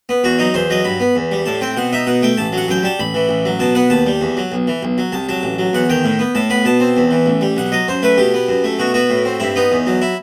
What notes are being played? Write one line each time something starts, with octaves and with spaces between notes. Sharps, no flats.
B3
E2 F#4
F#3 D#4
E2 C5
F#3 D#5
G2 B5
B3
E2
G3
A2 A5
C4 G5
B2 F#5
D#4 E5
B2 F#5
A3 G5
A1 A5
F#3 F#5
F#2 G5
G3 A5
A1 B5
E3
A1
F#3
B2 A5
B3 F#5
D#2 A5
G3
E2
F#3
B1
E3
B1
F#3
C2 A5
F#3 A5
A1
F#3
E2 F#5
D#3 G5
A2
B3
A2 A5
B3 B5
B2 A5
C4
E2
E3
A1
G3
B1 F#5
F#3 D#5
F#2 C5
A3 B4
B2 G4
B3
F#2
A3
B2 F#4
B3 F#4
A2
C4
G2 E4
B3 D#4
E2
F#3
E4